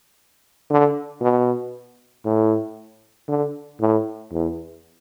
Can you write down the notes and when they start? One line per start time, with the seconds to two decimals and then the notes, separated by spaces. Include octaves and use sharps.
0.70 D3
1.21 B2
2.25 A2
3.28 D3
3.81 A2
4.32 E2